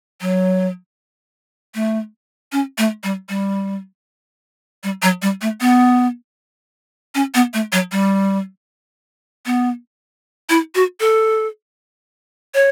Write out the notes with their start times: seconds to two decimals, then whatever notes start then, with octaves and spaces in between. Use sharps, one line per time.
0.21 F#3
1.75 A3
2.52 C#4
2.78 A3
3.04 G3
3.29 G3
4.84 G3
5.02 F#3
5.22 G3
5.41 A3
5.61 B3
7.15 C#4
7.35 B3
7.54 A3
7.72 F#3
7.92 G3
9.46 B3
10.50 E4
10.75 F#4
11.00 A4
12.54 C#5